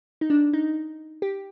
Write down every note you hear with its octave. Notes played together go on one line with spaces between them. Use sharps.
D#4
D4
D#4
G4